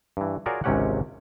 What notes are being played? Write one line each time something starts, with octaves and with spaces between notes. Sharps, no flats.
G2 E3
F4 F#4 G#4 A#4 C#5 D5
G#1 C#2 C3 C#4 G4 F#5